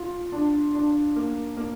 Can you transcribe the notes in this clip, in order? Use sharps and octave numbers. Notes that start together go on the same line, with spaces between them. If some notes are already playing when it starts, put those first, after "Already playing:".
Already playing: F4
D4
D4
A#3
A#3